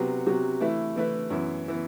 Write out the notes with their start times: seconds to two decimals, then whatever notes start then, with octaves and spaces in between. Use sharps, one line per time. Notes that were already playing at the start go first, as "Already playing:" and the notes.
Already playing: C3 F#3 B3 F#4
0.27 C3 F#3 B3 F#4
0.60 E3 A3 E4 B4
0.96 E3 A3 E4 B4
1.30 F#2 E3 B3
1.68 E3 B3